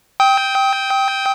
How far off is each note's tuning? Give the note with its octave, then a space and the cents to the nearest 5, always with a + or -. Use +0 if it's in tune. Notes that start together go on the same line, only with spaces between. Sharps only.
G5 +0 D#6 +40